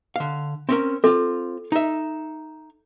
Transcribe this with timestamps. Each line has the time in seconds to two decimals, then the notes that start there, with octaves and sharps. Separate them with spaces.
0.16 D3 F5
0.69 C4 C#4 A#4
1.04 C4 F4 A4
1.72 D#4 E5